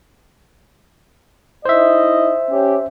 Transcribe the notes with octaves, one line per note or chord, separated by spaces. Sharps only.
D#4 E4 C5 D#5 E5
C#4 G4